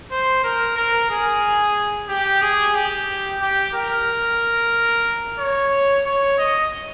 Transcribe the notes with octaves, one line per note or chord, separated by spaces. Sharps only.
C5
A#4
A#4
G#4
G4
G#4
G4
G4
A#4
C#5
C#5
D#5